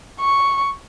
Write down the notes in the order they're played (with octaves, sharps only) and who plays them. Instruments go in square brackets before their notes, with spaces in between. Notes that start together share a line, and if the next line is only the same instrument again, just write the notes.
[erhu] C#6